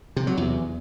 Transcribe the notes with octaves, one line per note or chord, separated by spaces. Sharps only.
C3
F#3
E2